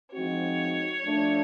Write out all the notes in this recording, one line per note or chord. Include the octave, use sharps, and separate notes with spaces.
F3 G#3 C4 D#4 F#4 C#5
F3 A3 D4